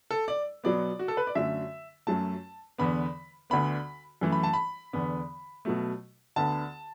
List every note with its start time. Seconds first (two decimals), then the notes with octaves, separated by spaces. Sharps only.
0.10 A4
0.28 D5
0.64 B2 F#3 B3 D5
0.99 F#4
1.08 A4
1.17 B4
1.27 D5
1.35 F#2 D3 F#3 A3 E5
2.07 F#2 F#3 A3 A5
2.78 E2 D3 B3 B5
3.50 D2 D3 B3 B5
4.21 F#2 E3 A3
4.32 B5
4.43 A5
4.53 B5
4.93 E2 D3 B3
5.65 B2 F#3 A3
6.36 D2 D3 B3 A5